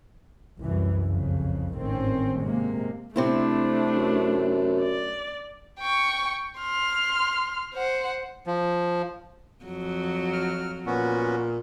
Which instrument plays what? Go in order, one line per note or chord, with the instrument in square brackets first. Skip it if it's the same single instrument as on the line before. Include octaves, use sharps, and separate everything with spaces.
[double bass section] C2 F#2 E3
F#1 C2 F2 C#3
G#1 A2 D#3 C4 C#4
C3 G#3 A#3
[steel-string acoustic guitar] C3 C4 E4 [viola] A3 D4
[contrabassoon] F#2
[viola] D5
[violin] G5 C#6
C6 F6
C5 F#5
[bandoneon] F3
[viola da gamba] F2 F#3
[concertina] F6
[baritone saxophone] A#2 [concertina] B3 C#4 F#4